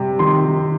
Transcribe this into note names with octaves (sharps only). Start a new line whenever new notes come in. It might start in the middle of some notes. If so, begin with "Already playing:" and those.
Already playing: C3 G3
D#3 C6
D#3